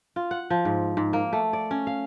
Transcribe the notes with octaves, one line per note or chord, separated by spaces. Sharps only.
F4
F#5
F3
G#2
G#2
A#3
A3
D5
C#4
F5